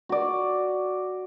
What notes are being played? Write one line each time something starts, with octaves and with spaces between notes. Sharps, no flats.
F#4 D5